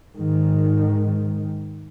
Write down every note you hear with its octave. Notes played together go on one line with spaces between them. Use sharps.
G#2 D#3